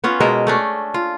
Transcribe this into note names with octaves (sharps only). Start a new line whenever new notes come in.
B3 C#4 F4
B2 G#3 A#4 E5
A3 C#4 D4
F4